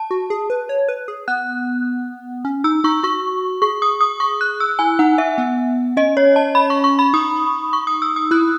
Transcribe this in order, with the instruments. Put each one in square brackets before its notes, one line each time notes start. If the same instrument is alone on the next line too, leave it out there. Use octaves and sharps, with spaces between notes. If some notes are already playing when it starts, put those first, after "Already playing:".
Already playing: [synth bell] A5
[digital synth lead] F#4
G#4
B4
C#5
B4
G#4
[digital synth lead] B3 [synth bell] F#6
[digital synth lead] C#4
[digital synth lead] D#4 [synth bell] E6
[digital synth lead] D#4 [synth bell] C#6
[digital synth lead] F#4 [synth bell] C#6
[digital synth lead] G#4 [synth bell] C#6
[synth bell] D#6
D#6
C#6
F#6
E6
[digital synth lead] E4 [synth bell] G#5
[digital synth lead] D#4 [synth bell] F#5
[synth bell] E5
[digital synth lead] B3
[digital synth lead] C#4 [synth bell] D#5
[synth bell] C#5
A5
B5
C#6
C#6
B5
[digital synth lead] D#4 [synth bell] D#6
[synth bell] C#6
D#6
E6
D#6
[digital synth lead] E4 [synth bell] F#6